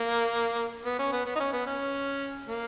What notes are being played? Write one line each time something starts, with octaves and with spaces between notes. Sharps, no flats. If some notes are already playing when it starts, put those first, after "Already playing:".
Already playing: A#3
B3
C#4
B3
B3
D#4
C#4
B3
C#4
A#3